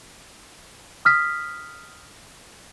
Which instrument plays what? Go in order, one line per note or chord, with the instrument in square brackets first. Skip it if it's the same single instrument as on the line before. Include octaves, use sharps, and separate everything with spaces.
[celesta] D#6 F6 B6